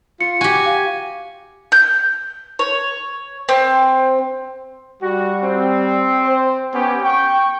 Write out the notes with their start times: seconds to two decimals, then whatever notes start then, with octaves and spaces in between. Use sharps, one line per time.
0.21 F4 C#7
0.41 F#4 G4 G#5
0.66 F5
1.72 G6
2.59 C#5
3.49 C4
5.02 G3 F#4
5.43 C4
6.25 C5
6.74 B3 C#4 G4
7.04 G5 C#6